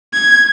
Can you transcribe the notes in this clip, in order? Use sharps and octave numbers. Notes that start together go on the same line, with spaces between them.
G#6